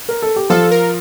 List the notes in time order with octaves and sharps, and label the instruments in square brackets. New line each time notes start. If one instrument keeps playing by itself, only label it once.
[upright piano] A#4
A4
G4
[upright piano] F3 F4 [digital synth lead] A4
[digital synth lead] A#4